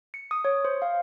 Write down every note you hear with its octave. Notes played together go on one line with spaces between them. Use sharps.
C#7
D#6
C#5
C5
F5